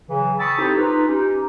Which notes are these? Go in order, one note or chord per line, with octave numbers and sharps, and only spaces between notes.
C#3 E3 F#3
G5 A5 B5 C#6 D#6 E6
C4 D#4 E4 G4 A4 C5
D#4 F4 B4
C#4 D#4 G4